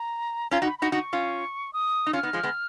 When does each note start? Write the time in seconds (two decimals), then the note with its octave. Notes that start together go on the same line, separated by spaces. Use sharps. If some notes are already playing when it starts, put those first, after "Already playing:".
Already playing: A#5
0.51 C#4 F4 A#5
0.62 D#4 F#4
0.66 B5
0.79 D#4 F#4 B5
0.92 D#4 F#4 C#6
1.13 C#4 F4
1.73 D#6
2.07 D#4
2.13 C#4 F4 F6
2.23 B3 D#4
2.33 F3 G#3
2.43 G#3 B3